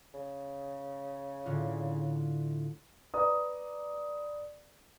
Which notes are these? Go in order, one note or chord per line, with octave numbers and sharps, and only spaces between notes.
C#3
A2 D3 F4
B4 D5 A#5 D#6